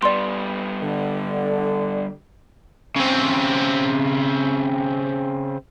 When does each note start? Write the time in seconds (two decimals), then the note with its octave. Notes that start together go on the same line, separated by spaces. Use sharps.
0.02 G3 B3 D5 C6
0.82 D3
2.96 C#3 C4